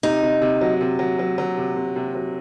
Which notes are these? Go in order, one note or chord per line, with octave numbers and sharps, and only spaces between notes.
C3 D#4
C3
C3
F#3
C3
F#3
F#3
F#3
C3
C3
C3
F#3